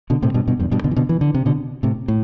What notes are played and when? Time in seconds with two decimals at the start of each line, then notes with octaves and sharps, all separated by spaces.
0.10 B2 D3
0.22 A2 C3
0.34 G2 B2
0.48 G2 B2
0.60 E2 G2
0.71 G2 B2
0.84 B2 D3
0.91 E3
0.96 B2 D3
1.09 E3
1.21 D3
1.34 C3
1.46 B2 D3
1.83 A2 C3
2.08 A2